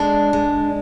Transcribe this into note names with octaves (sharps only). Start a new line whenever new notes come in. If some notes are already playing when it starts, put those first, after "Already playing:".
Already playing: G#3 D4
G#3